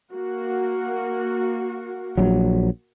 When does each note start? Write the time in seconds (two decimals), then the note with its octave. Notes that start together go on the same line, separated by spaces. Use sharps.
0.12 A#3 F#4
2.18 A#1 F#3